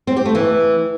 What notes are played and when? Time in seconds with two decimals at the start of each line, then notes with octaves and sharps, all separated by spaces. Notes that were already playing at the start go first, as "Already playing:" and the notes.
0.07 C4
0.16 G4
0.26 A3
0.35 E3